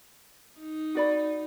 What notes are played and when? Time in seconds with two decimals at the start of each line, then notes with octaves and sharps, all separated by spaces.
0.58 D#4
0.95 F#4 D5 B5